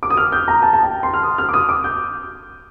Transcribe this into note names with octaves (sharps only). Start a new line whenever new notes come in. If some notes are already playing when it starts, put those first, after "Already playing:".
D6
D#6
F6
G6
A#5
A5
A5
G5
C6
F6
D#6
F6
D6
D#6
D6
G6